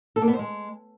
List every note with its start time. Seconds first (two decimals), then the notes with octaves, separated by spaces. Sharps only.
0.16 A4
0.22 A#3
0.28 B3
0.33 C5
0.39 G#3